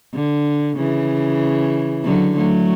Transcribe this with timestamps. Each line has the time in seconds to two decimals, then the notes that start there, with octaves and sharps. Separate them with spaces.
0.14 D3
0.77 C#3 E3
2.04 D3 F#3
2.36 F#3 A3